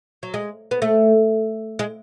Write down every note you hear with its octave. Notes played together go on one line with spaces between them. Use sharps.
F#3
G#3
B3
A3
G#3